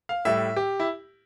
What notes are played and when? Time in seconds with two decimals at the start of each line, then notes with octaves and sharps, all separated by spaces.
0.09 F5
0.25 A2 G3 E5
0.56 G4
0.80 E4